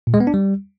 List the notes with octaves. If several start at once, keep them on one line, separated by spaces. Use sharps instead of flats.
A#2
G#3
B3
D4
G3